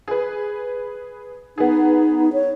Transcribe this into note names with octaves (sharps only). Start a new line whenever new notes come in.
G#4 B4
B3 D#4 G#4
C#5